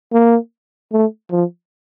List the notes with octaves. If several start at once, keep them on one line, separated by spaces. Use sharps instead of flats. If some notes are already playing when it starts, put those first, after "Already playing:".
A#3
A3
F3